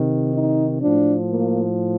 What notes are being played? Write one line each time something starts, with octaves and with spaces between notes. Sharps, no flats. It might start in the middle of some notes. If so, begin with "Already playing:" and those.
Already playing: C3 D#3
D#4
A2 F3 D4
A#3